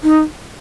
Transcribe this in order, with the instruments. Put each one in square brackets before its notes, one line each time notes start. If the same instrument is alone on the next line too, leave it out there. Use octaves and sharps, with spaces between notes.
[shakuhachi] D#4